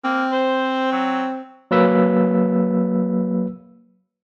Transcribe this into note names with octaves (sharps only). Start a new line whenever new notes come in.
A#3 C4
C5
F#3
F#3 A#3 B4 E6 B6